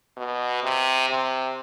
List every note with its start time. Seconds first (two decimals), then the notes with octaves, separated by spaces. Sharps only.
0.17 B2
0.63 C3
1.10 C3